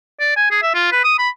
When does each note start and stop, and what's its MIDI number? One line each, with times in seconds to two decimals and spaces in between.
0.20 0.36 74
0.36 0.47 80
0.51 0.61 68
0.63 0.74 76
0.75 0.87 65
0.92 1.03 71
1.04 1.16 87
1.19 1.29 83